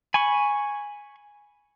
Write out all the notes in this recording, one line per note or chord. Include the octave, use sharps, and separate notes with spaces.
G#5 B5 C#6